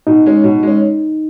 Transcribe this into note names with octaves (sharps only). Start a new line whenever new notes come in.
B2 D#4
G#3 C#4
B2
G#3 C#4